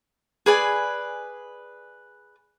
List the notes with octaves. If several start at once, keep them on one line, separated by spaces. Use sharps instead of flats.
G#4 B4 D5 G#5